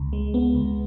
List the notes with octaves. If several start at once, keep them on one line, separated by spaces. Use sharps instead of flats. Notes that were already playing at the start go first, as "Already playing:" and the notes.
Already playing: C#2
G#3
B3
C#2